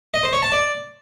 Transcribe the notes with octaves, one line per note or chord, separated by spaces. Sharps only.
D#5
C5
C#5
A5
D5